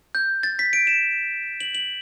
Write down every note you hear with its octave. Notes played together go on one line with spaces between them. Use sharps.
G6
A6
B6
D7
E7
F#7
F#7